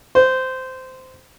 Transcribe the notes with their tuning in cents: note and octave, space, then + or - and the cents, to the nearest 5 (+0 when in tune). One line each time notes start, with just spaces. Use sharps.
C5 -15